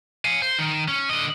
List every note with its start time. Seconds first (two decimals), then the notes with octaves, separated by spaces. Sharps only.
0.25 F5 G#5
0.42 C5
0.59 D#3
0.88 C#4
1.09 D3 D#5